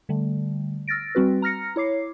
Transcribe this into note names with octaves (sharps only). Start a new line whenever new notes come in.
D3 G3 A3
E6 F6 A6 A#6 D7
G3 C4 F#4 B4
A#5 F6 A#6 C#7
E4 C#5 D6 C7